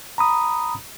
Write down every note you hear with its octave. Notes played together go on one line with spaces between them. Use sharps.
A#5 B5 D#6